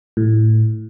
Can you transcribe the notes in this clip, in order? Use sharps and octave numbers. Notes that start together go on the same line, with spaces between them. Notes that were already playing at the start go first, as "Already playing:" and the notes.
A2